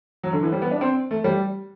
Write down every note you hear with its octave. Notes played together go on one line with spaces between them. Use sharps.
F#3
D3
E3
G3
B3
D4
C4
A3
G3